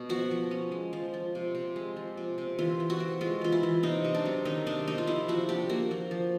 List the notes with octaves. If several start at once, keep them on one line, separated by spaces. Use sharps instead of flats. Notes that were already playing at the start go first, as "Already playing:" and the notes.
Already playing: B2
F3 F#4
F3
C#4
G#3
F3
F3
C3
C3
G#3
F3
C3
C3
E3 F4
E3
F#4
C4
G#3 F4
E3 F4
E4
E3
C3 D#4
C3
D4
F#3
D#3 D#4
C3 D4
C3 D#4
F4
F3 E4
F3 F#4
D4 G4
A#3 F#4
F3
F3